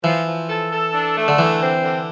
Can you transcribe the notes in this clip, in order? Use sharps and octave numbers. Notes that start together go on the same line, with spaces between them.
E3 F3
F3
A4
A4
D4
A3
D3
D3 E3
C4
D3